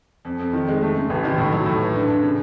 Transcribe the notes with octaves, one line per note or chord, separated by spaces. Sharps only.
F2
F2
D#3
G#3
A3
C#3
A1
D#3
A2
F#3
A2
E3
D4
D4
C#3